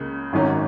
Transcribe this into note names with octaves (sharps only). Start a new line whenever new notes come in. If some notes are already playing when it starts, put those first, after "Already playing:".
Already playing: C#2 C#3 A#3
G#1 F#2 D#3 F#3 C#4